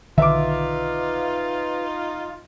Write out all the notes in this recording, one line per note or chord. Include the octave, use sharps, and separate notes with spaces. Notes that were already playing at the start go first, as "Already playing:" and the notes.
B1 D3 D#3 D#4 F4 B4 E5 D6